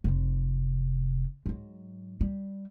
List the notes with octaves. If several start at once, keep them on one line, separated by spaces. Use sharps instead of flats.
F1 C3
G#2 F#3
G3